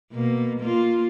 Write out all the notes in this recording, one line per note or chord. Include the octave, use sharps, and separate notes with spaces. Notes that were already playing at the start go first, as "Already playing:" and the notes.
B2 A#3
A#3 F4